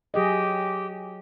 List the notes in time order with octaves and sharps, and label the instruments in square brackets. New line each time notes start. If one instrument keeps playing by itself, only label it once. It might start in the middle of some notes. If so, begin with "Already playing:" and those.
[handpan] F#3 G#4 D#5 [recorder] G4